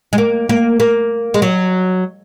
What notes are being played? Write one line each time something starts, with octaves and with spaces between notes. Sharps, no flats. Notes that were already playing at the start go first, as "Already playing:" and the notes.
G#3
A#3
A#3
A#3
G#3
F#3